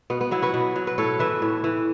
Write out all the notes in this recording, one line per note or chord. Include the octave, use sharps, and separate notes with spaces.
B2 B3
B3
F#3 B3 E4
F#4 B4
B2
F#3
B4
A2 A4 C#5
E3 B4 E5
A2
E3